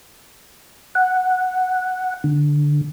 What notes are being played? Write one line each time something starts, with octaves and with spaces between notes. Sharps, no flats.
F#5
D3